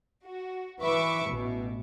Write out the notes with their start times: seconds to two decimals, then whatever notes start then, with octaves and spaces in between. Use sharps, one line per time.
0.25 F#4
0.82 E3 B4 E5 B5 C#6 D6
1.28 A1 B2